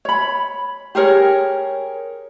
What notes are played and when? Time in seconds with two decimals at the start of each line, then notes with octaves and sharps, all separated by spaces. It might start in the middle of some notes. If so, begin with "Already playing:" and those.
0.05 C#5 B5
0.95 G4 G#4 A#4 C#5